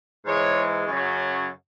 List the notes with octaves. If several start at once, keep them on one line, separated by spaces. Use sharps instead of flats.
G#2 E3 G#3 C#5
F#2 C#3 F#3